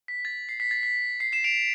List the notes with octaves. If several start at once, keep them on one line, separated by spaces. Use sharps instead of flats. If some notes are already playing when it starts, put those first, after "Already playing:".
B6
A6
C7
B6
A6
B6
C7
C7 E7
D7 F7